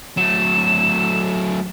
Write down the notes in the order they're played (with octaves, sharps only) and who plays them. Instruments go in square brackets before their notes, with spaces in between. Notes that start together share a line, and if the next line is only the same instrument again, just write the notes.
[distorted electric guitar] F#3 A3 [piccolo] E7